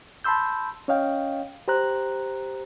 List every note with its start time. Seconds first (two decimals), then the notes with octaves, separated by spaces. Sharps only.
0.24 A5 B5 C6 E6 G6
0.88 C#4 C#5 D#5 F5 G5
1.68 G4 C5 A#5 F#6